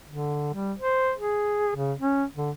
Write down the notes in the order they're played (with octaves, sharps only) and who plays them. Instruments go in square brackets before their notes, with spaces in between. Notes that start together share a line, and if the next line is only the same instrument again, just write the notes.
[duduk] D3
G3
C5
G#4
C#3
C#4
D3